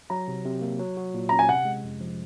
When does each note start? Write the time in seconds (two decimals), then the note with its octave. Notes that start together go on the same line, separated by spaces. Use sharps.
0.10 F#3 A#5
0.28 C3
0.45 C3
0.61 A#3
0.79 F#3
0.97 F#4
1.14 A#2
1.29 C#4 A#5
1.39 G#5
1.48 C3 F#5
1.65 G#3
1.84 F2
2.00 F3